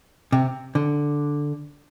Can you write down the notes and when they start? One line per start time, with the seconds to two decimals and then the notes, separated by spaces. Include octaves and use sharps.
0.32 C3
0.75 D3